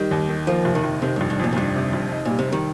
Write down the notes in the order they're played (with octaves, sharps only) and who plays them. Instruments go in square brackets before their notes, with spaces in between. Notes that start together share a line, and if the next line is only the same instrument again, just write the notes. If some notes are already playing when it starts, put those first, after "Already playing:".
Already playing: [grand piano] D#3 G4 [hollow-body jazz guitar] G3
[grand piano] D#2
D#3
[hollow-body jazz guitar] F3 [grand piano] A#3
[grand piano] F1
[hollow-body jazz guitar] D#3
[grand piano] F1
[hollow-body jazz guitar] C3 [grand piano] D#3
[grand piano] F1 [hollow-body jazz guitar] G2
[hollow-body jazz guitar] G2
[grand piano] F2 [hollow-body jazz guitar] A#2
[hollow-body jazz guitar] A#2
[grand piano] F1 [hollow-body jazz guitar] G2
[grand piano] C3
F1
D#4
[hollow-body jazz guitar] A#2 [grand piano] G3
[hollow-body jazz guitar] C3
[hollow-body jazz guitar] D#3 [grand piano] G3